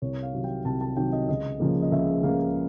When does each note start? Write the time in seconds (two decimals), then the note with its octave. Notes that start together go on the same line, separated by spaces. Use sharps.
0.02 C2 C#5
0.23 F5
0.33 C3 D#3 F#3
0.44 G5
0.65 C2 A5
0.81 A5
0.97 C3 D#3 F#3 G5
1.13 D#5
1.28 C#2 D#5
1.60 C#3 F3 A#3
1.82 D#5
1.92 C#2 E5
2.23 C#3 F3 A#3 F5